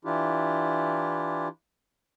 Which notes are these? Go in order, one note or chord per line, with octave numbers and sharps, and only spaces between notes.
E3 D4 E4 F4 G4